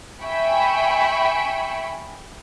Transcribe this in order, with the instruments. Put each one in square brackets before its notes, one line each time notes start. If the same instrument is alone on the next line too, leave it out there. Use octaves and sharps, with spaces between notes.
[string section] E5 G5 G#5 B5 C#6